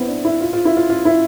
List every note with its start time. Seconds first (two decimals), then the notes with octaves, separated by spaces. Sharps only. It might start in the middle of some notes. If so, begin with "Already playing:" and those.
Already playing: B3 C4 E4
0.08 D4
0.25 E4
0.40 F4
0.53 F4
0.65 E4
0.77 F4
0.89 F4
1.05 E4